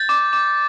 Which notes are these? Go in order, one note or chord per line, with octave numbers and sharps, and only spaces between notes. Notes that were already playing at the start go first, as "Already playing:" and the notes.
Already playing: G6 A6
D6
D6